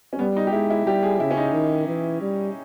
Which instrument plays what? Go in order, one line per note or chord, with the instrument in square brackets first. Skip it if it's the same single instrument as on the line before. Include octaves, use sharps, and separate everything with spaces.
[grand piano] C#4
[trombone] G3 [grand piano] B3
[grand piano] D#4
G4
[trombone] G#3 [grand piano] E4
[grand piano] E4
[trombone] G3 [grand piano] G4
[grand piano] G#4
[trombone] C#3 [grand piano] E4
[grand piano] C#4
D#4
[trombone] D#3
E3
G3